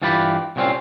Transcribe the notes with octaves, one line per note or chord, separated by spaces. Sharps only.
G2 E3 F4 G4 B5
C2 A#2 D#3 C4 C#4 F5